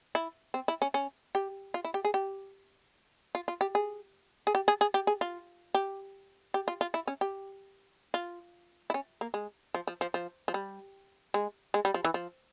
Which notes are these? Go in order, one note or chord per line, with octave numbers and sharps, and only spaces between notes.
E4
C4
E4
C#4
C#4
G4
F4
E4
G4
G#4
G4
F4
F4
G4
G#4
G#4
G4
G#4
G#4
G4
G#4
F4
G4
G4
F4
F4
E4
C#4
G4
F4
E4
C#4
A#3
G#3
F3
F3
F3
F3
F3
G3
G#3
G#3
G3
F3
E3
F3